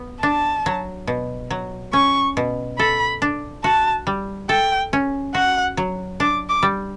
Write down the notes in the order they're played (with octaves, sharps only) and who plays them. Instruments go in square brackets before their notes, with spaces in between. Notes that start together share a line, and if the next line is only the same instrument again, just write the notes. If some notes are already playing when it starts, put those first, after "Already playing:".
Already playing: [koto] B3
[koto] D4 [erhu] A5
[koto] F#3
B2
F#3
[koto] C#4 [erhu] C#6
[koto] B2
[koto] A4 [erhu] B5
[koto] D4
[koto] F#4 [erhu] A5
[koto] G3
[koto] A4 [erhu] G5
[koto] C#4
[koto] F#4 [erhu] F#5
[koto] F#3
[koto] D4 [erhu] D6
[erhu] D6
[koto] G3